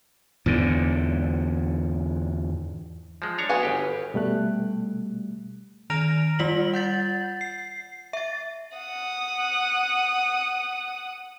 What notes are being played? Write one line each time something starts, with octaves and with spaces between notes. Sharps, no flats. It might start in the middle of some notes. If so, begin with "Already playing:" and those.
E2 G#2 D3
F3 G#3
D4 C#5 A#5
B3 F#4 G#4
G1 G4
B2 G3 A3 F#6
D#3 A#5 F6 A#6 D7 F7
G3 F4 D5 B6 F#7
F#5 G6 A6
C7
E5 A6
F#5 D#6